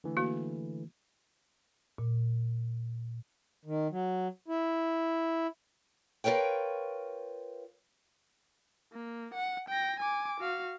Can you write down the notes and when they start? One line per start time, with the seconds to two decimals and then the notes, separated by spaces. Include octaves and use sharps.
0.04 D3 E3 A3
0.17 A#3 F#4
1.98 A#2
3.65 D#3
3.91 F#3
4.48 E4
6.24 F4 A#4 B4 C#5 G5
8.92 A#3
9.34 F#5
9.69 G5 A#6
10.00 G#5 D6
10.41 F#4 F5